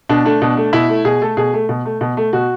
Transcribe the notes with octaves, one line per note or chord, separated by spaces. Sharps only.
B2 D4
A3 D4
B2
A3
B2 E4
A3
B2 G#4
A3 A4
B2 G#4
A3
B2
A3
B2
A3
B2 F#4